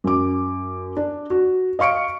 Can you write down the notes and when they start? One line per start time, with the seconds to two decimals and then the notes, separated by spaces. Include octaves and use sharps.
0.04 F#2 D6
0.97 D4
1.30 F#4
1.79 D#5 F5 C#6 C#7 D7